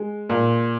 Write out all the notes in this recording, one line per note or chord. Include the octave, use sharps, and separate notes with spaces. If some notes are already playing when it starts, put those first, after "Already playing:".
Already playing: G#3
A#2